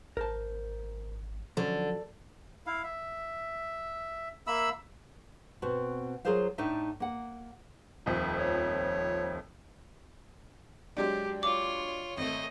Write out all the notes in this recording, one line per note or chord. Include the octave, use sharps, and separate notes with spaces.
G#1 A#4 C5 A5
D3 F3 F#3 C#4
E4 F5
E5
A#3 E5 B5 E6
B2 C4 F#4
F#3 F4 G#4 A#4 C5 F5
A2 A3 D4 D#4 E5
A#3 F#5
D#1 F2
C#5
F#3 G#3 D4 G4
F4 C#5 D6
G#1 A3 D#5